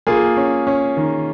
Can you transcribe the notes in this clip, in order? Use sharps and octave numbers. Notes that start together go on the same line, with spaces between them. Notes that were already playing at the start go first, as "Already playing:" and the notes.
A#3 F4 G#4
C#4
C#4
D#3